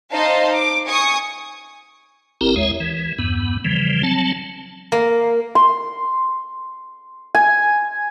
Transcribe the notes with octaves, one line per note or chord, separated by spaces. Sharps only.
D#4 C5 D#5 F5 A5
D6
G#5 C#6 D#6
G1 C4 E4 G4 A#4 A#5
D#2 G#3 C#5 E5
E3
E2 G2 B3
C#3 E3 F3 G3
F#3 C4 A5
A#3
C6
G#5